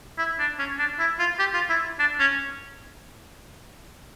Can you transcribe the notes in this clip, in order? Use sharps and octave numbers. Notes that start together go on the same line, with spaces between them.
E4
D4
C#4
D4
E4
F4
G4
F4
E4
D4
C#4